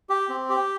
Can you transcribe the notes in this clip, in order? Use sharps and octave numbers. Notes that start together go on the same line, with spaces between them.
G4
C4
G4